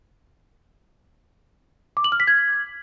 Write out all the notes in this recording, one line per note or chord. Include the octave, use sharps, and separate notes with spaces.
D6
F#7
F6
B6
G#6